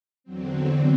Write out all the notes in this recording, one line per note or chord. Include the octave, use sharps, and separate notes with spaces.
E2 D3 F#3 C4
A4